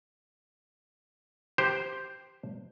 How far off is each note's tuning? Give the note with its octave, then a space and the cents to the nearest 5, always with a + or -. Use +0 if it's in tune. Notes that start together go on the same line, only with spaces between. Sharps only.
G4 +0 C5 +0